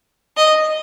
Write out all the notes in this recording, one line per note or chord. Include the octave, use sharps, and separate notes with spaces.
D#5